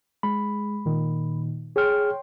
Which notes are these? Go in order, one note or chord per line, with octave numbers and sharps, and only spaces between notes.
G#3 B5
A#2 D#3
G#4 C#5 G5 C6 F6